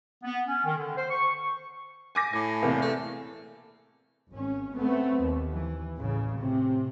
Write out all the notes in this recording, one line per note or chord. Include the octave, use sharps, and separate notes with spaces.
B3
C#4
D#3
D3
C5
C#6
G#5 D6 A#6
A2 G#5
E2 C3 A#3
A3
G#1 C#4
A3 B3 C4
D#2
E3
A1 C#3
A2 C3